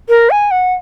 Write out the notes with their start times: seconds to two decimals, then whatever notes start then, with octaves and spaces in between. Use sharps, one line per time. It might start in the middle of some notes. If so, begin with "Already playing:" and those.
0.09 A#4
0.30 G#5
0.51 F#5